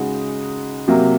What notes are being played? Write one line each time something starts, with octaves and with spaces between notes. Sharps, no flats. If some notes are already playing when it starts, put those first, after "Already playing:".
Already playing: C#3 G#3 D#4 F#4
C3 F#3 A#3